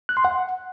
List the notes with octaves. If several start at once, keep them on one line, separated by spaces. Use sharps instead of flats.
F#6
C6
F#5